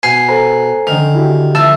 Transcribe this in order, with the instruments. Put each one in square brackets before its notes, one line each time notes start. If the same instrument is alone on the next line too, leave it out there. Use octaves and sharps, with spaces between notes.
[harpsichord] B2 [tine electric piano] G#5 C7
[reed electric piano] A4 C5 A#5
[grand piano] D3 F7 [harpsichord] D#3
[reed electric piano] E4 F#4 G4
[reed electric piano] F3 [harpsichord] A3 [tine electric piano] A5 E6